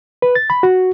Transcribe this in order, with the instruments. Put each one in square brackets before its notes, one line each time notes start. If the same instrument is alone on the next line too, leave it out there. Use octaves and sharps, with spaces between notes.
[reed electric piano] B4
A6
B5
F#4